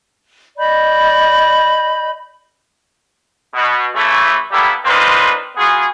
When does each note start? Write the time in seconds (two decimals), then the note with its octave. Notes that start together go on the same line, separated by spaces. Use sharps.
0.58 D5 D#5 B5 G6
3.54 B2
3.95 C#3 E3 A3
4.52 G3 A#3 B3 E4 G4 A4
4.85 A#3 C4 D4 D#4 F4 B4
5.56 B3 F4 F#4 G#4